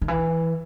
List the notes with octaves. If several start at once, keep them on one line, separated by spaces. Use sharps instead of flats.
D#3
E3